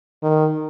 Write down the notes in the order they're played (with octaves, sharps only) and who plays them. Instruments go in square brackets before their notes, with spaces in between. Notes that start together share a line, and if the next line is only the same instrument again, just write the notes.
[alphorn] D#3